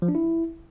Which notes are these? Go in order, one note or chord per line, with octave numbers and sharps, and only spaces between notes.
F3
D4
E4